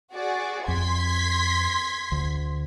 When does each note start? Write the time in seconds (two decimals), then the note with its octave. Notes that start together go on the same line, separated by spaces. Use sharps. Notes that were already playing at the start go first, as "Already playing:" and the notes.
0.13 F#4 G#4 D5
0.68 F2 C6 G#6 B6
2.12 D2